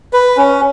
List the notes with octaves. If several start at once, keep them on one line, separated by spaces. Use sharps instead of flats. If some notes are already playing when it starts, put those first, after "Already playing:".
B4
C#4